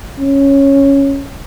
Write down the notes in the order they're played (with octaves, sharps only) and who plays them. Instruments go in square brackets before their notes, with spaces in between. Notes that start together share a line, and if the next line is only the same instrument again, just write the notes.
[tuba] C#4